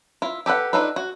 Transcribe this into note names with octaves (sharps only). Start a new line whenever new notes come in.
E4 F4
G4 A4 B4 F#5
D4 D#4 F4 A4 B4
F#4